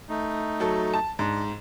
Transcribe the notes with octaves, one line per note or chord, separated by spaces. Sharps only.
A3 D#4
F#3 A4
A5
G#2 D4